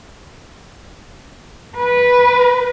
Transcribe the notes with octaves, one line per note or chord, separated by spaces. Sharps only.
B4